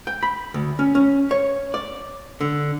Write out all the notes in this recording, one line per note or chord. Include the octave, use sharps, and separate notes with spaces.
G5
B5
D2
C#4
C#4
C#5
D5
D3